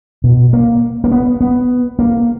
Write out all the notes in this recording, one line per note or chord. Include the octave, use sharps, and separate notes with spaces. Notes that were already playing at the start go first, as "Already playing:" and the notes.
B2
A#3
A#3
B3
B3
A#3